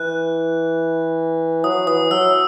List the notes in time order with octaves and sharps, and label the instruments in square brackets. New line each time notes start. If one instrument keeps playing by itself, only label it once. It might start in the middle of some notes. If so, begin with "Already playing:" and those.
Already playing: [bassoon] E3 [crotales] F#6
[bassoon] F#3 [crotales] D#6
[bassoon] E3 [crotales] D#6
[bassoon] F#3 [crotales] E6